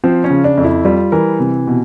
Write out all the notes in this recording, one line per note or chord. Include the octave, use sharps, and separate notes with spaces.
F3 C4
C#4
C#3
D4
F2
E4
G3 F4
E3 A#4
C3
B2